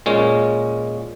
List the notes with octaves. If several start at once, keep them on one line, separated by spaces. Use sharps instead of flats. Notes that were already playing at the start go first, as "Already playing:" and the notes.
A#2 G#3 C#4